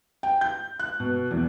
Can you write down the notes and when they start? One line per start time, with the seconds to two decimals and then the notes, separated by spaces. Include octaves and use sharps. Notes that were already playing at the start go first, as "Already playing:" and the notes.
0.23 G5
0.41 G6
0.80 F#6
1.00 B2
1.31 E2